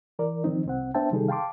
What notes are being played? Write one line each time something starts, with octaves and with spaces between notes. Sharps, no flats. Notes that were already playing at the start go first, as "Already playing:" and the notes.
E3 A#4 D5
D#3 F3 C4 D#4
C2 C4 F#5
B3 D4 C5 E5 G5 A5
C3 D#3 G3 D#4 G#4 A4
F5 G5 A5 C6 D6